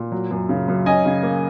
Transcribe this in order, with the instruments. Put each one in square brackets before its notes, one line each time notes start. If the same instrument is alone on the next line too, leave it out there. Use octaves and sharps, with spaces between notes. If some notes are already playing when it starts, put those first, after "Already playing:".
Already playing: [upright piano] A#2
F#3
F#2
C#3
F#2
C#4 D#5 G#5
C#3
A#3